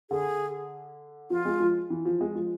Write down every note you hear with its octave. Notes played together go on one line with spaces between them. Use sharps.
D3 G#4
F3 F4
G#3
F3
E3
F3
G#3
F3